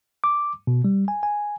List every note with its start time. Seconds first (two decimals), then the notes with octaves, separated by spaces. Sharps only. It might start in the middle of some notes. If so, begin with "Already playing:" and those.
0.24 D6
0.67 B2
0.84 G3
1.08 G#5
1.23 G#5